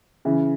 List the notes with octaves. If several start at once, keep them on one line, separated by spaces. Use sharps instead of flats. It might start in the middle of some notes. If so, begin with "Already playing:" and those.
C#3 E3